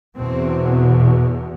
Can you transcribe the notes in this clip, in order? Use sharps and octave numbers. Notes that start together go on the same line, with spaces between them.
E2 B2 C4